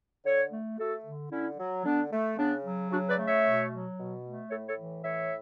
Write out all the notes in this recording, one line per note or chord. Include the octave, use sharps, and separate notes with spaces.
D3 A4 C#5
A3
A3 F#4 A4
D3
D3 C#4 E4
F#3
D3 B3 D4
A3
C#3 B3 D4
F#3
C#3 D4 F#4
B4 D5
A3
C#5 E5
B2
F#3
B2
A3
A2 A4 C#5
A4 C#5
E3
A2 C#5 E5